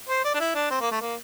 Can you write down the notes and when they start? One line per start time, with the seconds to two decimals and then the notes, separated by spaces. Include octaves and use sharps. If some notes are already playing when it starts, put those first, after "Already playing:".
0.09 C5
0.25 D5
0.34 D4
0.40 E4
0.55 D4
0.71 C4
0.81 A#3
0.92 A3
1.01 A#3